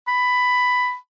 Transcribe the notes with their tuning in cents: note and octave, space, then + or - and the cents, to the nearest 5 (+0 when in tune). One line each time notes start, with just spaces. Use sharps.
B5 +10